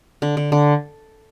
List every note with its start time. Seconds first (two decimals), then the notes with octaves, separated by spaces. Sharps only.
0.22 D3
0.37 D3
0.52 D3